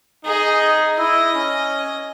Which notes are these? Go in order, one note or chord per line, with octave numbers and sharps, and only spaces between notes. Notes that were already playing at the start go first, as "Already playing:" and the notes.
D#4 G#4 D#5
E4 D#5
C#4